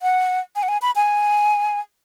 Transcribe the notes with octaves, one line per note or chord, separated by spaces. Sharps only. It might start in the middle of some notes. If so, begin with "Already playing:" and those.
F#5
G#5
F#5
G#5
B5
G#5